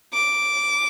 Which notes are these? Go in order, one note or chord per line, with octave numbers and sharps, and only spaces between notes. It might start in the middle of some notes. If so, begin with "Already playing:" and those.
D6